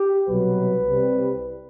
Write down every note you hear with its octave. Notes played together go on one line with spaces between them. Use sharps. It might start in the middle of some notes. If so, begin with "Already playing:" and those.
Already playing: G4
C2 B2 F#3 B4
C2 C3 G3